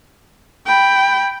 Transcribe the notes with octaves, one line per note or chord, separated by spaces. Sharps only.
G5 B5